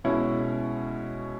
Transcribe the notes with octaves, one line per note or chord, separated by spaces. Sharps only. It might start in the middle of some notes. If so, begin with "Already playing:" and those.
B2 G#3 B3 C#4 E4